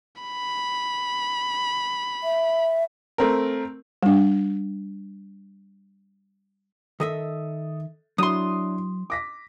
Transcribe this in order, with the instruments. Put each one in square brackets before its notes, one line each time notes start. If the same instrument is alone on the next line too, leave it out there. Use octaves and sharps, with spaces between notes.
[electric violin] B5
[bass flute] E5
[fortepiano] A3 C4 A#4
[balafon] G3 D4
[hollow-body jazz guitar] D#3 D#5 E5 [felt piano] A4 D#6
[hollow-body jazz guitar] F#3 [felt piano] D4 E4 [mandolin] C6 D#6
[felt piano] D6 A#6 B6